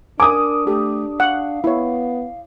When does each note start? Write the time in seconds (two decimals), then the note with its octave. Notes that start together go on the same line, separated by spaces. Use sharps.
0.20 D4 A#4 G#5 D6 D#6
0.67 A3 G4 A4
1.20 F5 F#5
1.64 B3 E4 C#5